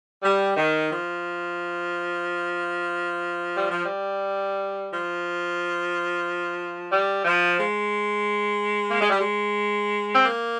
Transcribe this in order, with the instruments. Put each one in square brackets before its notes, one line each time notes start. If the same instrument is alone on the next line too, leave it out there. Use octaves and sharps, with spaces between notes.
[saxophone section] G3
D#3
F3
G3
F3
G3
F3
G3
F3
G#3
A#3
G#3
G3
G#3
C4
A#3